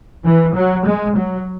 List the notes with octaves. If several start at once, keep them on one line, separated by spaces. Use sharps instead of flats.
E3
F#3
G#3
F#3